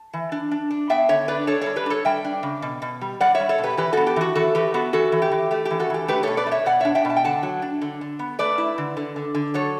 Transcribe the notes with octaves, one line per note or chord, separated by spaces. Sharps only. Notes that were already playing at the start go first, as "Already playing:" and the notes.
Already playing: A5
E3
D4
D4
D4
B3 E5 G5
D3 C#5 E5
D4 B4 D5
D4 A4 C#5
G3 A4 C#5
G4 B4
D4 A4 C#5
G3 E5 G5
D4
C#3
B2
B2
G3
G3 D5 F#5
C#5 E5
G3
A4 C#5
B2
G4 B4
E3 G4 B4
B3 F#4 A4
G4
E3 F#4
E3 F#4 A4
E3 G4 B4
B3 F#4 A4
E3 F#4 A4
E3
G4
E3
A3 G4
G4
E3
F#4 A4
E3 G4
A3 G4 B4
B2 A4 C#5
B4 D5
A3
C#5 E5
B2 D5 F#5
D4 C#5 E5
E5 G5
B2
A5
G5
D3 F#5 A5
F#3
D4
D3
D3
B3
A3 B4 D5
E4
D3
D3
D3
D3
F#3 A4 C#5